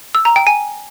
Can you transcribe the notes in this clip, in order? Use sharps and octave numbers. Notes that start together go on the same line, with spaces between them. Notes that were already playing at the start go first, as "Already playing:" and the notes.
E6
A#5
G5
G#5